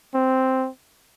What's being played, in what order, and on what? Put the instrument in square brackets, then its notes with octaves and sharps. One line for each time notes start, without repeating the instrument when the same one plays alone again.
[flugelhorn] C4